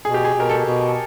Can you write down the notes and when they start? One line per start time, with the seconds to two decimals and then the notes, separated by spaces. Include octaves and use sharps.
0.04 B2 G#4
0.14 G4
0.25 G#4
0.34 B2
0.40 A#4
0.49 A4
0.65 B2